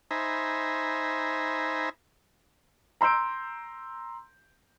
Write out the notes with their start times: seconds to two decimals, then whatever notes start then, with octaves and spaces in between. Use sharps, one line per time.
0.11 D#4 C5 E5 G#5 A#5 B5
3.01 A#5 C6 E6 G6 D7